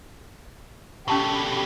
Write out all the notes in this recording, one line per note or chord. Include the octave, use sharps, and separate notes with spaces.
B2 D3 C#4 G4 A5 C#6